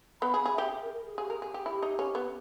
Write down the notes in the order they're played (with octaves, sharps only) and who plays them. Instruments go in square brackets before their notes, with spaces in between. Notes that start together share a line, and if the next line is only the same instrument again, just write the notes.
[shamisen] B3 [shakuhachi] B5
[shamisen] G#4
[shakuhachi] B5
[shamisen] G#4
[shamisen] G4 [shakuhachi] E5
[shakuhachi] G#4
A#4
A#4
G#4
[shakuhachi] G4 [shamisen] G#4
[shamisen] A#4
G#4
G4
[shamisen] E4 [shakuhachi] G4
[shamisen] D#4
C#4
B3